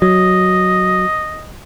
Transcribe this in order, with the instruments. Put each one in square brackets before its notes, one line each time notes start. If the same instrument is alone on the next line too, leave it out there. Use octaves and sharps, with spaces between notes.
[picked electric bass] F#3 [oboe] D#5